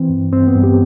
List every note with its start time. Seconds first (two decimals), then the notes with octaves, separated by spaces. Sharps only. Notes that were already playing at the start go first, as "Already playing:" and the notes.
Already playing: E3 C4
0.10 G2
0.32 G2 C4
0.48 B3
0.56 G2
0.64 G4